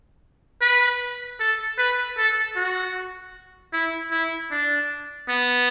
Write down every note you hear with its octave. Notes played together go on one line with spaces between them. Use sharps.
B4
A4
B4
A4
F#4
E4
E4
D4
B3